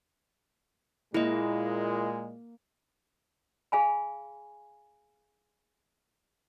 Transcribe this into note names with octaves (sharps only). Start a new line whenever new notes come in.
A#2 G#3 A#3 E4 D#5
G#4 F5 G#5 B5